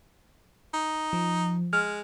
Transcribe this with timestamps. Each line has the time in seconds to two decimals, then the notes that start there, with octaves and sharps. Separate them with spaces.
0.74 D#4
1.13 F3
1.73 G#3 F6